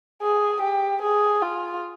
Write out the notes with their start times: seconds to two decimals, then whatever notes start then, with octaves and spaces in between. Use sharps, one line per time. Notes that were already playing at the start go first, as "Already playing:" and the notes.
0.22 G#4
0.62 G4
1.02 G#4
1.42 F4